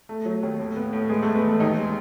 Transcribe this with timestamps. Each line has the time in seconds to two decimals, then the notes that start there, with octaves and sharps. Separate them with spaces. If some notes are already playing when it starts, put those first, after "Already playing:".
0.09 A3
0.25 F#3
0.43 D#2
0.59 A2
0.77 B3
0.93 A2
1.09 G#3 B3 G#4
1.22 A3 A4
1.27 G#3
1.35 B3 B4
1.44 E2 A3 A4
1.60 D#2 D#4
1.78 G#3